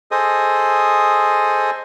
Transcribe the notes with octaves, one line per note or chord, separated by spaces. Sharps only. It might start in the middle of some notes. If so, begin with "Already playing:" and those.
G#4 A4 C5 D#5 D#6